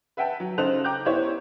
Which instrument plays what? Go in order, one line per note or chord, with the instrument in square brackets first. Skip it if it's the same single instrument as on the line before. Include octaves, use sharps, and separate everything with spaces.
[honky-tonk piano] B4 E5 F#5 G5 A5
F#3
C#3 D#4 A4 C5 F#6 F7
G5 A#5 D6 F#6 G6
B3 E4 G4 C5 C#5